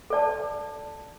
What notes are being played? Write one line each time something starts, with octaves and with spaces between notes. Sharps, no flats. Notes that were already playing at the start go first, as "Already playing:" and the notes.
A4 D5 A5